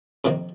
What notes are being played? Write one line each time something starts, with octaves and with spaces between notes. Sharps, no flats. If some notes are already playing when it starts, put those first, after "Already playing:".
F2 C3 D#3 A#3